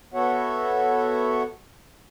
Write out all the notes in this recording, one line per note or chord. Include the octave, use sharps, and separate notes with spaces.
B3 F#4 A4 C#5 E5 F#5